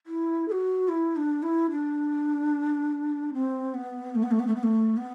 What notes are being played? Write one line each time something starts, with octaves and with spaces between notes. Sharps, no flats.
E4
A4
F#4
E4
D4
E4
D4
C4
B3
A3
B3
A3
B3
A3
B3
A3
B3